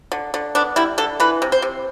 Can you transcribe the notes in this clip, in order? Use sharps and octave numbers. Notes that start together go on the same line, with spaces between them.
D3
D3
B3 D4
G3 E4
D3 A4
E3 B4
C3
C5
C3